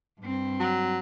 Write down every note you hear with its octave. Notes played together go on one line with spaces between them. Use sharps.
G2 C4
F#3